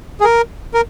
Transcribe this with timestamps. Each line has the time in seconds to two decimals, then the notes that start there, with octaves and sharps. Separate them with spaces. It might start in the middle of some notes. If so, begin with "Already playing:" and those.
0.20 G#4
0.24 A#4
0.74 A#4